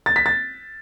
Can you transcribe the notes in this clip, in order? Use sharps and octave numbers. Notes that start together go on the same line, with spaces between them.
A6
B6
A6